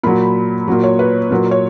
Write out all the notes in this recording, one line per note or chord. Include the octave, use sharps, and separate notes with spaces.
A#2 F#3 B5
A#2 F#3
C#5
B4
A#2 F#3
C#5